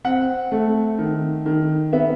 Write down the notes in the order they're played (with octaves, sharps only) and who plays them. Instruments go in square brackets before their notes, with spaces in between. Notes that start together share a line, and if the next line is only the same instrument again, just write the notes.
[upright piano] C4 F#5
A3
D#3
D#3
B3 E5